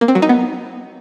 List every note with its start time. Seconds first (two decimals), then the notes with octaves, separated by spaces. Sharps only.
0.01 A#3
0.08 C4
0.15 F#3
0.22 D#4
0.29 B3